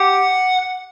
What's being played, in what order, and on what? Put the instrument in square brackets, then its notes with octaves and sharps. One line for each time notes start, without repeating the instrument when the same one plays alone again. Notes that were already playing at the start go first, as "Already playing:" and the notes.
Already playing: [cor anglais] G4 [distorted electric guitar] F#5